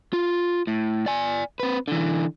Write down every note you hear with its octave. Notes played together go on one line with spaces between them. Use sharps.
F4
A2
D5 G#5
C4 B4
D3 E3